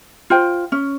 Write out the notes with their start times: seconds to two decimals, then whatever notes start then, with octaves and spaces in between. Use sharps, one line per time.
0.30 F4 C5 G5
0.72 C#4